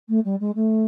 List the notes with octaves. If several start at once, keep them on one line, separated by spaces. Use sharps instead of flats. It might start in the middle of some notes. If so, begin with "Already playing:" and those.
A3
G3
G#3
A3